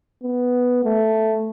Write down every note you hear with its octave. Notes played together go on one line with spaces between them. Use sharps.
B3
A3